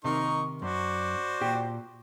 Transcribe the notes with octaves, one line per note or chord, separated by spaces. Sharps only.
C3 D#3 D#4 A#4 C#6
F#2 F#4 C5 D5
A#2 G4 G5